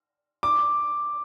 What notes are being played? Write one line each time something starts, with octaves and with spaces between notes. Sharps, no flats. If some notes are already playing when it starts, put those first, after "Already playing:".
D6